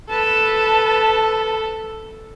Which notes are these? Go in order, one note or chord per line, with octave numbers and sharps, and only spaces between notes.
A4 B4 A5